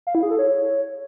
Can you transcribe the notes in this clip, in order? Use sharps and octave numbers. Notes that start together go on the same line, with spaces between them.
F5
E4
G#4
A4
C#5